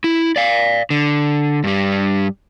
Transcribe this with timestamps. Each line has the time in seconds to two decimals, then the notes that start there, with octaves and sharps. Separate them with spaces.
0.04 E4
0.36 D5 F5
0.90 D3
1.64 G2 G3